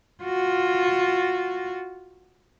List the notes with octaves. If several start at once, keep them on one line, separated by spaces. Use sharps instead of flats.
F4 F#4